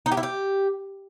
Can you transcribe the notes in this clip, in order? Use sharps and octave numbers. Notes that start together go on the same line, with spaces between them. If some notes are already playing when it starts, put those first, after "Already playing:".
D#4
G4
E4
G4